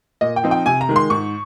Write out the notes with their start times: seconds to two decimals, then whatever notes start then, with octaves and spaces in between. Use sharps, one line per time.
0.21 A#2 D#5
0.36 G5
0.43 F3 C4 D#4
0.51 G5
0.66 C3 G#5
0.81 A#5
0.89 D#3 G#3
0.96 C6
1.10 G#2 C#6